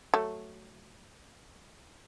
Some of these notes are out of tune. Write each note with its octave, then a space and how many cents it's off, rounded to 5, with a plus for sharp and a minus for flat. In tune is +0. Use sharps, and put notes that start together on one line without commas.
F#3 +0 A3 +0